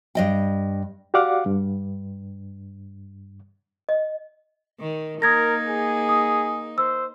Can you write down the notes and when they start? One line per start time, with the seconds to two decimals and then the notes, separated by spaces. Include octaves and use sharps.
0.15 G2 D#5 G5
1.14 F#4 G4 D5 F5 F#5 D6
1.46 G2
3.89 D#5
4.80 D#3
5.22 A#3 D#4 A#4 D#6 G#6 A#6
5.67 G#4
6.09 D#6
6.78 C5 E6